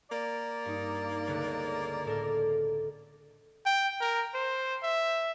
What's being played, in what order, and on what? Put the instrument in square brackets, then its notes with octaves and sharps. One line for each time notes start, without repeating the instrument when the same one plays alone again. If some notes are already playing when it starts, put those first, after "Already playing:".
[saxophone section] A#3 D5
[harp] G2 D#4
C#2 D3 B3
A2 A4 A#4
[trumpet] G5
A#4
C5
E5